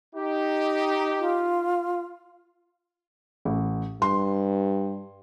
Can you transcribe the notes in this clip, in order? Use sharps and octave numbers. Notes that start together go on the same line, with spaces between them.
D#4 G4
F4
A1
G2 C6